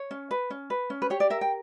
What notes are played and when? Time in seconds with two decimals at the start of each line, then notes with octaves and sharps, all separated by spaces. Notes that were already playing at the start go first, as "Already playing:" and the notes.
Already playing: C#5
0.11 C#4
0.31 B4
0.50 C#4
0.70 B4
0.90 C#4
1.02 B4
1.10 G4 C#5
1.20 D5
1.30 A#4 E5
1.41 G5